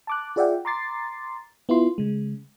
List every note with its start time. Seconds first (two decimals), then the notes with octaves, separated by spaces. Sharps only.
0.07 A5 D6 F#6
0.36 F4 G#4 D5 E5 F#5 G5
0.65 A#5 C6 D6 A6 C7
1.69 B3 E4 F4 C6
1.98 C#3 G#3